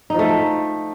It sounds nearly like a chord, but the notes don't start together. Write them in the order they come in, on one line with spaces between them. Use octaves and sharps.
D#4 F3 A3